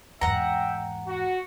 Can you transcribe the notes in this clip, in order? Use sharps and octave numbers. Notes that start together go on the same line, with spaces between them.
E2 G#2 E5 F#5 G5 A#5
F#4